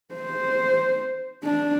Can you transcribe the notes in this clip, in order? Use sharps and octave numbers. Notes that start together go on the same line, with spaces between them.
C5
D4